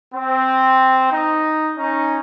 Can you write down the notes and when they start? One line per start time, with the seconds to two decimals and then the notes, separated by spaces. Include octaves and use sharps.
0.13 C4
1.11 D#4
1.76 C#4 D#4